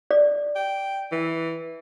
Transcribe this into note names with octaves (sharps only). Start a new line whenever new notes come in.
D5
G5
E3